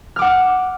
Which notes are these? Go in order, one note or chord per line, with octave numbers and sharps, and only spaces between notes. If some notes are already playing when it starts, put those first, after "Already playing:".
F#5 D6 F6